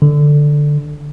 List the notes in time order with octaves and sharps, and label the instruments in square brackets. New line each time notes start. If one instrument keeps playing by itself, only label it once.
[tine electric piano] D3